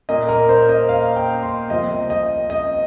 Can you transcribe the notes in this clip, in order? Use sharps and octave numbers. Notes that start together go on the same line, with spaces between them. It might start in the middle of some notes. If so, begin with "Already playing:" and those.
A#2 A#3 D#5
A#4
C5
D#5
F5
G5
C6
C2 C3 F3 C4 D#5
D#5
D#5